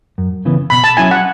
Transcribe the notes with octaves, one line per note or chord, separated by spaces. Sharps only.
F#2
C#3 E3 B3
B2 B5
A5
F#3 C#4 E4 G#5
F#5